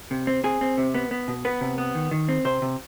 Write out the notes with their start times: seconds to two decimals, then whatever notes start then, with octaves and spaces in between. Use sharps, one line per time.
0.11 C3
0.27 C4
0.44 C4 G#4
0.61 C4
0.78 C3
0.94 B3
1.11 B3
1.28 B2
1.45 B3 B4
1.61 C3
1.78 B3
1.95 D#3
2.11 D#3
2.28 C4
2.45 C3 C5
2.62 C3